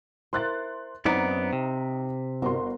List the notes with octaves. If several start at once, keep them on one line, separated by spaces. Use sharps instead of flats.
E4 A#4 C5 C6 F#6 A6
F#2 B3 C4 D#4 D5 A#5
C3
G1 F#4 A#4 C5 C6